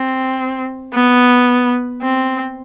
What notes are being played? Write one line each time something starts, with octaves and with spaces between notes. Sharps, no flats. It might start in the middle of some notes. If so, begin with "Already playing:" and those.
Already playing: C4
B3
C4